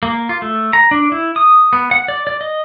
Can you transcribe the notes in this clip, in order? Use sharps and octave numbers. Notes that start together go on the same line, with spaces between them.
A#3
F4
A3
A#5
D4
E4
D#6
B3
F#5
D5
D5
D#5